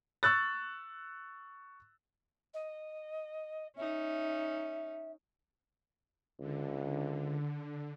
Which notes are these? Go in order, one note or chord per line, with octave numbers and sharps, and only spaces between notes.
C#6 E6 F#6 A6
D#5
C#4 D#4 E5
C#2 D3